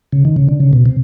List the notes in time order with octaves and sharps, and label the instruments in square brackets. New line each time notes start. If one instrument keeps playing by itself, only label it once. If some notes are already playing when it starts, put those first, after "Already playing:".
[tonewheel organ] C#3
D#3
C#3
D3
C#3
B2
C3